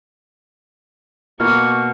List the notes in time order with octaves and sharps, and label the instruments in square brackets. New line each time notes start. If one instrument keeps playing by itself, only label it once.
[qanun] B2 A#3 [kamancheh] C#6 [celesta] F6